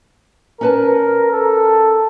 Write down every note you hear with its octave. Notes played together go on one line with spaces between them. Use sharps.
C#4 A#4 B4 A5
A4